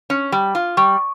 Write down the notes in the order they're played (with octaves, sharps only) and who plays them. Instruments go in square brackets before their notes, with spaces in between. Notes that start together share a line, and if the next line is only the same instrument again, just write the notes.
[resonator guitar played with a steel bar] C#4
G3
F4
[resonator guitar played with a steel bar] G3 [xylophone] C#6